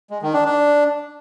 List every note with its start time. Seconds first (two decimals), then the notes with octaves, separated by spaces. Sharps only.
0.11 G#3
0.22 D#3
0.34 D4
0.45 D4